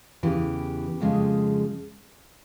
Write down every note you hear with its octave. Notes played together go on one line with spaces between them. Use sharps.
E2 C#3 E3 G4
F2 C#3 F3 G#3